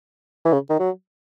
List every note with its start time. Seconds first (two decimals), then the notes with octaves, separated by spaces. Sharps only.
0.45 E3
0.53 C#3
0.70 D#3
0.79 F#3